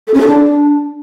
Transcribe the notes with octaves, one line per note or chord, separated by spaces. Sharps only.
A4
C#4
A4
D4